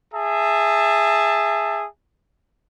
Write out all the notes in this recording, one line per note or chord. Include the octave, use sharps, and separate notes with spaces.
G#4 E5 A5